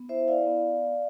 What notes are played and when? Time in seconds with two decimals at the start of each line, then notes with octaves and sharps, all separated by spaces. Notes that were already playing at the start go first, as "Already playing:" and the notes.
Already playing: B3
0.09 E4 C5 E5
0.28 E4 D5 F5
0.46 B3